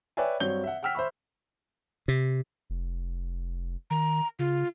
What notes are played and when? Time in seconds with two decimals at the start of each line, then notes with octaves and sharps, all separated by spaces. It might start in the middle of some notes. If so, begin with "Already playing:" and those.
0.17 B4 C#5 D5 E5 G5 G#5
0.40 G2 F#3 C4 C#5 G6 G7
0.64 E5 F#5
0.83 F#5 G5 E6 F6 B6
0.95 C5 E5 B5 C#6
2.08 C3
2.70 F1
3.91 D#3 A#5
4.39 C#3 F4